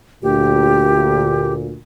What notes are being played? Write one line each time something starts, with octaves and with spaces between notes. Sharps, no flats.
D2 A#2 G4